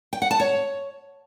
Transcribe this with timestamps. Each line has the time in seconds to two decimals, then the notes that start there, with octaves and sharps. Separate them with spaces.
0.13 G5
0.22 F#5
0.31 A5
0.40 C#5